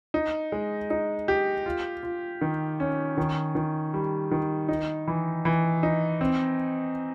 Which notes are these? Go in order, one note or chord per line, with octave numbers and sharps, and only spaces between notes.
D#4
G#3
D#4
G4
F4
F4
D#3
C#4
D#3
D#3
G3
D#3
D#4
E3
E3
D#4
C4